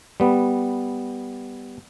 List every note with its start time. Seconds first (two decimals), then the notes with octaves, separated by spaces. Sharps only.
0.20 G3 B3